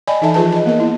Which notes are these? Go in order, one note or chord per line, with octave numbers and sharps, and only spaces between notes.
D5 D#5 G5 G#5 B5
E3 D#4 A4 E5 A5
F3 F4 G#4 B4 A5
D#5 A5
A#3 B3 A#4 D#5
E4